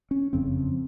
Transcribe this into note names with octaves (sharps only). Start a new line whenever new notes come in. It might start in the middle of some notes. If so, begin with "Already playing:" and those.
C#4
F#1 F2 C#3 C4